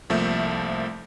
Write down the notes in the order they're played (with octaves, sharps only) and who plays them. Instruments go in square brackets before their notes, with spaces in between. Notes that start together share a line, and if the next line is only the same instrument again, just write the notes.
[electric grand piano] C2 F3 A3 A#3 E5 G6